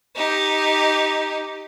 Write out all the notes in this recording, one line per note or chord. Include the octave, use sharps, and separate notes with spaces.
D#4 G4